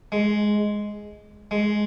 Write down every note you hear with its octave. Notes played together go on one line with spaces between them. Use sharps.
G#3
G#3